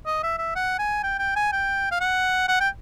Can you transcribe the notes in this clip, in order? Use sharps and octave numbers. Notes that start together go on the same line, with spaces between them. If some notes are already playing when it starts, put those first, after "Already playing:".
D#5
E5
E5
F#5
G#5
G5
G5
G#5
G5
F5
F#5
F#5
G5